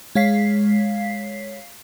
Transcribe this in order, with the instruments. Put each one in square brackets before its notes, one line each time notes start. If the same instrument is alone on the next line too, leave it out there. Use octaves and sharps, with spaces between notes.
[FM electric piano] G#3 C#5 F5 B6 C7